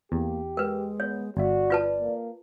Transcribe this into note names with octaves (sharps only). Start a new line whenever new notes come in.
E2 A#3 G4
G#3 A#4 B4
B3 C#5
G1 F#4 D5 E5
F4 B4 A5
A#3